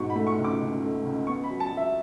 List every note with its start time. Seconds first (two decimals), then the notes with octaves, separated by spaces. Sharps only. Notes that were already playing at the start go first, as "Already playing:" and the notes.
Already playing: G#2 B2 C#6
0.10 B5
0.16 A3
0.27 C#6
0.39 C#2
0.44 D6
0.61 C#2
0.82 A3
1.05 C#2
1.27 B3 C#6
1.44 B5
1.50 F#3
1.60 A5
1.72 F#3 E5